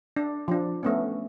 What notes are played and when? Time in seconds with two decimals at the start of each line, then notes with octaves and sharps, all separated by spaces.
0.16 D4
0.48 F3 D4
0.83 A3 B3 C#4